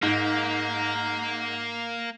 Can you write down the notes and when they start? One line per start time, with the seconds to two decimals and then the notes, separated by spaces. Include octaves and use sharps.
0.03 G#2 A#3